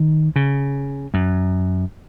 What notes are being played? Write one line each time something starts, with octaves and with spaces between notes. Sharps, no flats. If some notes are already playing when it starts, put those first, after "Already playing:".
Already playing: D#3
C#3
F#2